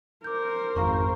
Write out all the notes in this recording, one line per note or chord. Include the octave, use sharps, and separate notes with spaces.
A#4 C5 D6 G6
G#1 F2 F5 A#5 C#6